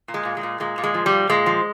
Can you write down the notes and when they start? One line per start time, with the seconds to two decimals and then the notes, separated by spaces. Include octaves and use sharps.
0.08 A#2
0.14 G#3
0.25 A#2
0.37 G#3
0.43 A#2
0.60 A#2 G#3
0.78 A#2
0.83 G#3
0.94 F3
1.06 G3
1.12 A#2
1.29 A#2 G#3
1.46 F3